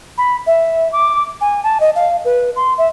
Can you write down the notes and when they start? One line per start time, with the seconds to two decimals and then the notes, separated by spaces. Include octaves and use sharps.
0.18 B5
0.47 E5
0.92 D6
1.41 G#5
1.63 A5
1.80 D#5
1.95 F5
2.25 B4
2.56 C6
2.78 E5